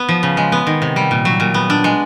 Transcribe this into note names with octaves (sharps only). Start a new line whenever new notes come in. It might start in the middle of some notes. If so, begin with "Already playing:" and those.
Already playing: B3
F3
C#3
G#3
B3
D#3
C3
G3
A#2
F#3
A#2
B3
D4
G#3